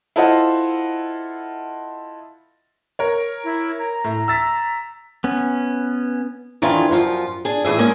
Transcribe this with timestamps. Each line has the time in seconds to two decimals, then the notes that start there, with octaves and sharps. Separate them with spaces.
0.16 E4 F4 A4 C5 D#5 F#5
2.99 A#4 C#5
3.44 E4
3.79 A#5
4.04 A2
4.28 E6 A6 B6
5.24 B3 C#4
6.62 F2 D#3 E3 D4 F4 C#5
6.91 F#2 F3 F4
7.45 D4 G#4
7.64 A2 E3 G#4 E5
7.79 G#3 A#3 C#4 D5 G#5 A#5